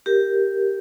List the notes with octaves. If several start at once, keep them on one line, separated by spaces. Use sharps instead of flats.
G4 A#4